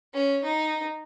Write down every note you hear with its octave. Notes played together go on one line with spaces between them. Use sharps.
C#4
D#4